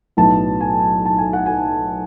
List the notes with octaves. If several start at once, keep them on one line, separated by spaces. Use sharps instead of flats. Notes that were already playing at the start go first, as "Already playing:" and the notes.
B1 A2 F#3 B3 E4 A5
G#5
A5
G#5
F#5
G#5